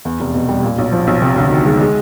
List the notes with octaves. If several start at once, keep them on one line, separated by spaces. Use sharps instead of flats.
E2
F1
B2
G3
A#2
B1
F3
B1
C3
D2
D#3
G#3
G#3